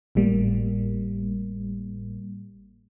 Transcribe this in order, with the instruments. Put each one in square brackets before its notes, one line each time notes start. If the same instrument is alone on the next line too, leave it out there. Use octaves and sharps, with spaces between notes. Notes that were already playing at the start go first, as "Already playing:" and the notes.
[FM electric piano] G#1 A2 G3 A#3